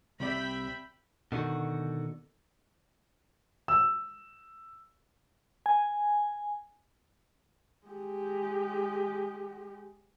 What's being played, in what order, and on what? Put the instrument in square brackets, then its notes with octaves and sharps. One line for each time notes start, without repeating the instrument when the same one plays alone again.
[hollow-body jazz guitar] C2 C3 D5 [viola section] E5 G5 B5
[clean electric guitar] B2 D3 D#3 F#4
[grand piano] E6
[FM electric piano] G#5
[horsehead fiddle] G#3 G4